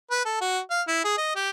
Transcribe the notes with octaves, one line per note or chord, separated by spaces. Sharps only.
B4
A4
F#4
F5
E4
G#4
D#5
G4